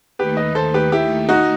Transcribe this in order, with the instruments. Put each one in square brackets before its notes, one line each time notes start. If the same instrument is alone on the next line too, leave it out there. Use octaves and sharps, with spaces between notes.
[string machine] D#2 D#3 A3 D#4 [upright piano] G4 B4
[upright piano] B4 D#5
A4 C5
G4 B4
E4 G4
D#4 F#4